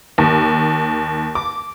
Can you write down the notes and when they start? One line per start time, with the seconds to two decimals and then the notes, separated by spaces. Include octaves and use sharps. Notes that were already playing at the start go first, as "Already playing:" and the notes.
0.18 D#2
1.35 D6